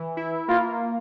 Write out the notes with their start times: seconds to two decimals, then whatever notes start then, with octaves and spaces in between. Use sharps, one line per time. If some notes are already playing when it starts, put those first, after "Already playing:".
Already playing: E3
0.17 E4
0.48 A#3 F4